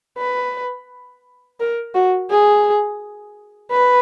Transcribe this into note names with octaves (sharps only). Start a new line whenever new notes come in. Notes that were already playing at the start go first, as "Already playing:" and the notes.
B4
A#4
F#4
G#4
B4